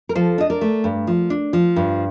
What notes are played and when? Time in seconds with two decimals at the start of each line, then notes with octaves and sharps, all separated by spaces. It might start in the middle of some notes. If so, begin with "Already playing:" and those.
0.09 A#4
0.15 F3 A4 C5
0.38 D4 D#5
0.50 A#4 D5
0.61 A3
0.84 G2
1.07 F3
1.30 D4
1.53 F3
1.76 G2